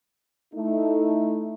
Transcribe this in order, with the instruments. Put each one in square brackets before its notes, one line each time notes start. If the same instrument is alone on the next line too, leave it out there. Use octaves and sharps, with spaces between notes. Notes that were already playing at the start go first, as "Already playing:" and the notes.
[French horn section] A3 D#4 E4